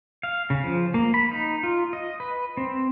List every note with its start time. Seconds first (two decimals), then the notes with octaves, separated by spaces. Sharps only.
0.23 F5
0.50 C#3
0.64 F3
0.94 A#3
1.14 B5
1.31 D#4
1.63 F4
1.93 D#5
2.20 B4
2.57 C4